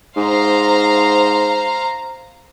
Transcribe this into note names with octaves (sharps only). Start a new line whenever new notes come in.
G#2 C5 F5 A#5